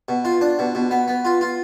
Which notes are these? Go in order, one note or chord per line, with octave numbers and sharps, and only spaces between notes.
B2
F4
D4
B2
B2
B3
B3
F4
F4